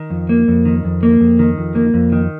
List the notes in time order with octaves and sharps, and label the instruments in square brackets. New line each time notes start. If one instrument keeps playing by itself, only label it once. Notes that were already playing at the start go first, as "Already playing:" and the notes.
Already playing: [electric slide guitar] D#3
F2
A#3
F2
D#3
F2
A#3
F2
D#3
F2
A#3
F2
D#3